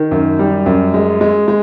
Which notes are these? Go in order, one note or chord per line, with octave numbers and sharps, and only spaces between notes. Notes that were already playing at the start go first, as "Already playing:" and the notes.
Already playing: D#3
F#2
G3
F#2
G#3
G#3
G#3